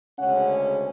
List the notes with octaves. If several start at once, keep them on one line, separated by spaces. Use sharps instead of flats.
D2 C#3 G#3 C#4 F#5